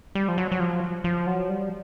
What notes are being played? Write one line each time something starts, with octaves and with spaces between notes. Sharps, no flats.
G3
F3
F#3
F#3
F3
F3
F#3
G3